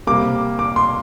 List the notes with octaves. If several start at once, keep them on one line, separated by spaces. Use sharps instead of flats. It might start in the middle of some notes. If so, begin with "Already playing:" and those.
C3 G3 A#3 D6
D6
C6